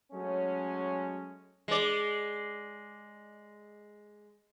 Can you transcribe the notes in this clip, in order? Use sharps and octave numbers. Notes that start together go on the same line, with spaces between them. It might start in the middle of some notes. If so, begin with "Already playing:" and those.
F#3 G#3 A3 C#4
G#3 D5